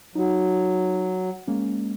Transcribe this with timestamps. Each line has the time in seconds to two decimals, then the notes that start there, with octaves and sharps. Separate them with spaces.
0.15 F#3 D#4 F#4
1.47 G#3 A#3 C#4